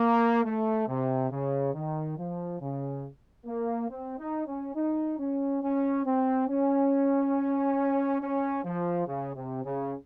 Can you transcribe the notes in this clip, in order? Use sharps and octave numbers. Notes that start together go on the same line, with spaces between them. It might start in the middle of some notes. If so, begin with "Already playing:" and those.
Already playing: A#3
A3
C3
C#3
D#3
F3
C#3
A#3
C4
D#4
C#4
D#4
C#4
C#4
C4
C#4
C#4
F3
C#3
C3
C#3